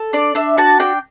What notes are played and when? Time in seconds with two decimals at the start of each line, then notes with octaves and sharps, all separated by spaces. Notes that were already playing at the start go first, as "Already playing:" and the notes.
Already playing: A4
0.13 D4 D5
0.35 D4 E5
0.57 F#4 A5
0.80 D4 G5